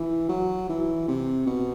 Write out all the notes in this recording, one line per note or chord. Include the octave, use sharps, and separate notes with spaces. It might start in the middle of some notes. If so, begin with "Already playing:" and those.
Already playing: E3
F#3
E3
C3
B2